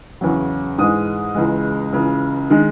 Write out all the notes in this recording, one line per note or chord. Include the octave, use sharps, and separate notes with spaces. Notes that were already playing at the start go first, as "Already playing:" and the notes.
E2 C#3 F#3
G#2 E3 G#3 D#6
C#2 C#3 E3 G#3
C#2 C#3 E3
D#3 G#3